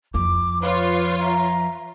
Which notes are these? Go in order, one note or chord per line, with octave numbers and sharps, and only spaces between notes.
F2 F3 D6
F4 B4 C#5
E5 A#5